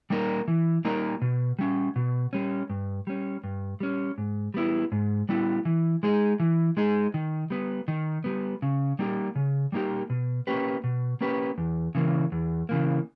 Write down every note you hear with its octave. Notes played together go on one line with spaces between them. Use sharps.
G3 A#3 D#4 A#4
E3
G3 A#3 D#4 A#4
B2
G3 C#4
B2
G3 C#4
G2
G3 C#4
G2
G3 C#4
G#2
G3 B3 E4
G#2
G3 B3 E4
E3
G#3 D#4 G#4
E3
G#3 D#4 G#4
D#3
G3 B3
D#3
G3 B3
C#3
G3 A#3 D#4 G4
C#3
G3 A#3 D#4 G4
B2
A#3 C#4 G4 B4
B2
A#3 C#4 G4 B4
E2
C#3 E3 A#3
E2
C#3 E3 A#3